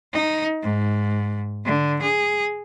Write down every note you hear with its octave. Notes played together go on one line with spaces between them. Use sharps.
D#4
G#2
D3
G#4